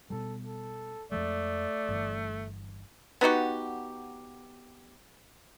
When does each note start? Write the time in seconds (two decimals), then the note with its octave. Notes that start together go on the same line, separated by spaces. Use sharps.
0.10 B2 G3 A4
0.46 A4
1.12 F2 F3 G#3 A3 D5
1.88 G1 G2 E3
3.21 B3 D#4 F#4 G4